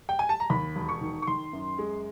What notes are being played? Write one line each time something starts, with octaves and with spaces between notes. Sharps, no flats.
G5
G#5
A5
A#5
D#2 B5
E1
C#6
D#3
C#6
D#3 C6
F#2
G#3